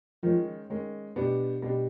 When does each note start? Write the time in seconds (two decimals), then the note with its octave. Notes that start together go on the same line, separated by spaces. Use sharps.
0.23 D#3 F3 G#3 C#4
0.70 D#3 G#3 C#4
1.16 B2 G3 B3 D4 G4
1.62 B2 G3 B3 D4 G4